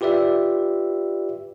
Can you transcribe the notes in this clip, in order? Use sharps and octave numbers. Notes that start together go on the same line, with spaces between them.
F4 G4 B4 D5 E5